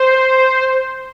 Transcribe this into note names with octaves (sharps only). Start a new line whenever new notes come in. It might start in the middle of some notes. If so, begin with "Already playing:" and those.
Already playing: C5